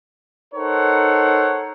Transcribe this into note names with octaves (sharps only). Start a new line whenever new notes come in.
D#4 A4 A#4 C5 C#5 F#5